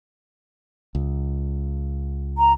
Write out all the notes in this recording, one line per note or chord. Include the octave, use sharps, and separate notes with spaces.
C#2
A#5